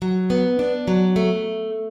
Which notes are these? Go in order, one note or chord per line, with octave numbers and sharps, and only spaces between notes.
F#3
B3
D4
F#3
A3